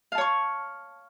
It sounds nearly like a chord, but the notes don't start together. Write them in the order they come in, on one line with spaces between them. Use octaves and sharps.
F5 A5 C#5 C#6